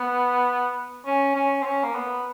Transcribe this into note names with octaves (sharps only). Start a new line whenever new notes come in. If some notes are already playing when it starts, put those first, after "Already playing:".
Already playing: B3
C#4
C#4
C4
C#4
A#3
B3